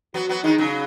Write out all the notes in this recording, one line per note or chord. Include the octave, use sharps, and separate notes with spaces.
F#3 B3 F#4
F#3 B3
D#3 G#3 D#4
C#3 F#3